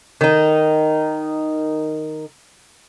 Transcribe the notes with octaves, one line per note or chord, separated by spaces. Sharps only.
D#3 D#4